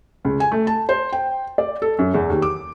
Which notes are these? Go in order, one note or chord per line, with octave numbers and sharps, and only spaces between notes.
C#2
G#5
A3
A5
C5
G5
D5
A4
F#2
E2
D#2
D6